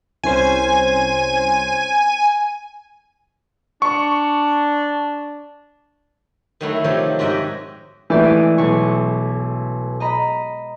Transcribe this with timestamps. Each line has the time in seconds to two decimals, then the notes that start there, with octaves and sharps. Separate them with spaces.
0.24 C2 C#4 C5 G#5
3.82 D4 C#6
6.61 D#3 F#3 A3 E4
6.84 C3 D#3 F3 F#3 G4 C#5
7.19 G#2 F#4 G4 D#5 E5 G5
8.10 E3 A3 E4 G4 D5
8.24 G#3 D#7
8.58 B1 C#6
10.00 D#5 A#5 B5